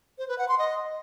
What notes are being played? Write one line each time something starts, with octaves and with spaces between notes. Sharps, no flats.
C5
B4
F#5
C6
D#5